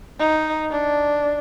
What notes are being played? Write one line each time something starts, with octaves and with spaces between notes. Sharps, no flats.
D#4
D4